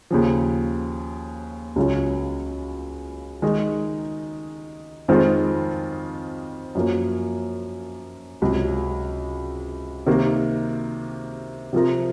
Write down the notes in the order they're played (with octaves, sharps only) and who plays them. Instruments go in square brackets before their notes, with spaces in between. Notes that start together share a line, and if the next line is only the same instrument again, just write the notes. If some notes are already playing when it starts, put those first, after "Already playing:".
[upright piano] D#2 C#3 F3
C#2 C#3 F#3 C#4 F4
D#3 G#3 D#4
F2 D#3 G#3 C4 F4
F#2 F3 A#3
C#2 C3 F#3
C3 D#3 A#3
C3 F3 C4 F4 A#4